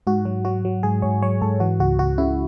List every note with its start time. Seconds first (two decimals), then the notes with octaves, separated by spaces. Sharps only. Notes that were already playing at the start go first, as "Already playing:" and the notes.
0.07 G#2 F#4
0.25 F#3
0.45 F#3 F#4
0.65 F#3
0.83 G#2 G#4
1.02 G#2 C#5
1.22 F#3 C#5
1.42 G#2 A4
1.60 E3 F#4
1.79 C#2 F#4
1.99 C#2 F#4
2.18 C#3 E4